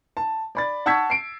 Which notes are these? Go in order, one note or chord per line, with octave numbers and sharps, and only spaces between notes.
A5
D5 B5 A6
F#5 A5 C#6 E6 G#6 B6
C7 D7